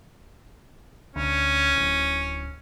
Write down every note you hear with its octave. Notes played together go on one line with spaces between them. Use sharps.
D2 C#4
D1